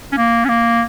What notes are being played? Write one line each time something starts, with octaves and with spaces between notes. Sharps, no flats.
C#4
A#3
C#4
A#3